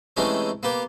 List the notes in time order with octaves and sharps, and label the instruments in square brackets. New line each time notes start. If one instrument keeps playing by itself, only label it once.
[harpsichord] C3 E3 G#3 A3 C#4 D#4
A#3 B3 G4